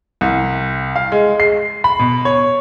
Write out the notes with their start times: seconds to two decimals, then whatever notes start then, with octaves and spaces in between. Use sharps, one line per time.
0.21 C2
0.96 F5
1.12 G#3
1.40 C7
1.84 B5
1.99 B2
2.25 C#5